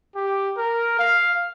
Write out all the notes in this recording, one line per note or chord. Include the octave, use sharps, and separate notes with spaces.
G4
A#4
F5